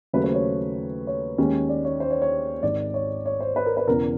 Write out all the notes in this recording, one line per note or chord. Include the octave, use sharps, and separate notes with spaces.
D#2 C#3 F#3 A3 B4
C5
C#5
C#5
D#2 D#3 G#3 C#4
D5
C#5
C5
C#5
C#5
G#1 G#2 D#3 D5
C#5
C#5
C5
B4
A#4
B4
E1 E2 C#3 A#4